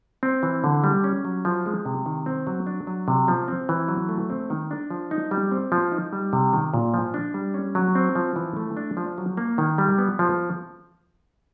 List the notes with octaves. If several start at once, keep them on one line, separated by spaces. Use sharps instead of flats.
C4
E3
D3
G3
C#4
F#3
F3
G#3
C3
D#3
C4
F#3
D4
F#3
C3
F3
C4
E3
F#3
A3
C4
D#3
D4
F3
D#4
G3
C4
F3
D#4
G3
C3
D#3
A#2
F3
D4
G3
C#4
F#3
C4
F3
E3
A3
D4
F3
F#3
A#3
D#3
G3
B3
F3